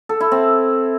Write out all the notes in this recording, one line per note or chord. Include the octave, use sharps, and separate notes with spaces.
A4
E4
C4